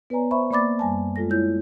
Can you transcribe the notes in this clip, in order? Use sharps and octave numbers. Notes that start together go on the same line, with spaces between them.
B3 B4 C#5 D5 G#5 A#5
C5 E5 B5 C#6
A#3 D5 B5 D6 A6
F#2 G3 G#5 A5
G#3 F4 A4 A#6
E4 C#5 G6